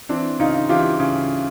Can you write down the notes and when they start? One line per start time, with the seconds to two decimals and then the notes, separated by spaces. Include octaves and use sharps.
0.09 E3 C4 D4
0.40 C#3 D#4 F4
0.69 E3 F4 G4
1.00 C#3